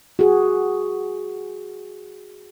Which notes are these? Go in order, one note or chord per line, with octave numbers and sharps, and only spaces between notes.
F#4 G#4